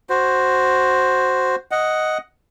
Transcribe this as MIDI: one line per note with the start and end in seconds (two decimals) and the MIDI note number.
0.09 1.56 66
0.09 1.56 72
1.71 2.18 75
1.71 2.18 78